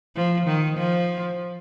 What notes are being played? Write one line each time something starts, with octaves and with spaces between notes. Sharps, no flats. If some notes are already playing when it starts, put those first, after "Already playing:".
F3
D#3
F3